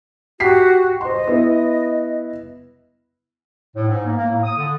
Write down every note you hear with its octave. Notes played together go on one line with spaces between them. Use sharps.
F#4 G4 B6 C7
C5 D#5 C6
B3 E4
A2
G#2
A#3
A#3
A2
D#6
D3